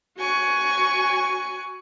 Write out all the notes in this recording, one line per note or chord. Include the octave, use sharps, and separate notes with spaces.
F#4 G#5 C#6